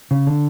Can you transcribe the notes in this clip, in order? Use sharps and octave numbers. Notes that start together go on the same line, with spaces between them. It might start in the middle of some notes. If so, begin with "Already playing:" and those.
C#3
D3